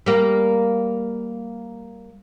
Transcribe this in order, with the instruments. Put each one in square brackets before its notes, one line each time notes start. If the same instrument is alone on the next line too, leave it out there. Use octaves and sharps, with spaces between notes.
[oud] G3 A#3